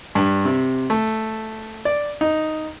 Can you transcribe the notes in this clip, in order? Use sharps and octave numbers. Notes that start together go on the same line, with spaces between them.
G2
C3
A3
D5
D#4